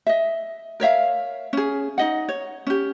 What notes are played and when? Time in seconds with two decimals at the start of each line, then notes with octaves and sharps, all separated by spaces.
0.07 D#5 E5
0.80 A#4 C#5 E5 F5
1.53 C#4 G#4
1.98 D#4 D#5 F#5
2.29 C#5
2.67 C#4 G4